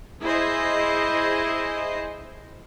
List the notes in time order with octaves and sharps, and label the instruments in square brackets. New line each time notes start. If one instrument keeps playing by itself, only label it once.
[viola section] E4 G#4 C5 D#5